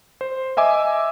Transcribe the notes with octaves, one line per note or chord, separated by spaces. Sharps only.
C5
D#5 E5 G#5 D6